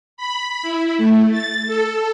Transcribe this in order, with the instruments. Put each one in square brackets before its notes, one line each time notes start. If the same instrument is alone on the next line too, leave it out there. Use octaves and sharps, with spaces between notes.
[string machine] B5
E4
A3
A6
A4